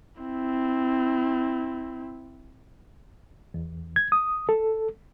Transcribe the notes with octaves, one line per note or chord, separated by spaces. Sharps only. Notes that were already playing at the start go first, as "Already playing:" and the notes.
C4 E4
E2
G#6
D#6
A4